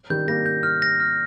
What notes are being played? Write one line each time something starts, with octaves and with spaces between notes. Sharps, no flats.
D#3 G3 G6
G3 A#3 A#6
G6
F6
A#6
F6